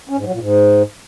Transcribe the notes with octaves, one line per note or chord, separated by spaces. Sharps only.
C#4
G#2
F#3
A#2
G#2